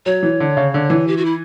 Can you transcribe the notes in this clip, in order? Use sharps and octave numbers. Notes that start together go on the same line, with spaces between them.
F#3 C#5
E3
D3
C#3
D3
E3
G4
F#4
E4